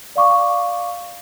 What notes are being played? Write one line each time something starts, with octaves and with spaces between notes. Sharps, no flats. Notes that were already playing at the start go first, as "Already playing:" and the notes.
D5 F5 C#6 D6